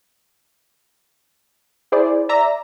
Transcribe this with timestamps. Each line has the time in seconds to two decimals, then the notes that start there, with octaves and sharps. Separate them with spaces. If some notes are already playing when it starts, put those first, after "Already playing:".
1.92 E4 G#4 C5 D5
2.29 D5 E5 A#5